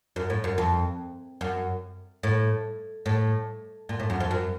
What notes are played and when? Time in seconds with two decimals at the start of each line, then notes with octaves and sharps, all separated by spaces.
0.16 F#2
0.30 A2
0.44 F#2
0.58 F2
1.41 F#2
2.23 A2
3.06 A2
3.89 A#2
4.00 A2
4.10 F#2
4.20 F2
4.31 F#2